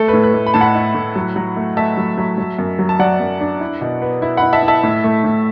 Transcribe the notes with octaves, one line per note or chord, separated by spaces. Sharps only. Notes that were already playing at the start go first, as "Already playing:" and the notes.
Already playing: A3 A4
A2 B4
B4
A3
B5
A2 A5
F#5 B5
E4
A2
F#3
F#3
A3
A3 E5 A5
F#3
F#3
F#3
F#2
F#3
A5
F#3 D5 F#5
F#2
D4
E4
B2
B3
E4
E4 F#5 B5
E5 A5
E4
E5 A5
A2
A3
A2